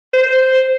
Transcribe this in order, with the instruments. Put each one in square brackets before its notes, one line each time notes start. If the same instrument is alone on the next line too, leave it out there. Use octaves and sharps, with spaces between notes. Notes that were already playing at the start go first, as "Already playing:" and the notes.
[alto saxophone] C5